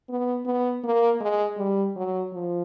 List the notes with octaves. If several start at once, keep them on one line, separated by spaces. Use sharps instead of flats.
B3
B3
A#3
G#3
G3
F#3
F3